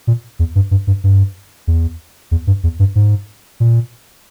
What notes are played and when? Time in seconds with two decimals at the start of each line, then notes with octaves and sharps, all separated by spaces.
0.07 A#2
0.39 E2
0.55 G2
0.71 G2
0.87 G2
1.04 G2
1.67 E2
2.31 E2
2.47 G2
2.63 E2
2.79 G2
2.95 G#2
3.60 A#2